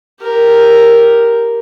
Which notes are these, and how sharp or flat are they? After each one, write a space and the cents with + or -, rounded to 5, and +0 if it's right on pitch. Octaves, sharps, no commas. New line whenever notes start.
G4 +0 A#4 +0